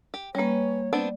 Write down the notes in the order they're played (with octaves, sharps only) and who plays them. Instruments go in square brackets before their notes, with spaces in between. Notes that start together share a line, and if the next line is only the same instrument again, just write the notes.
[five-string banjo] G4
[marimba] G3 A#3 [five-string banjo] C#4 B4 [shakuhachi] C#5
[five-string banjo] B3 C4 D4 [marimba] D5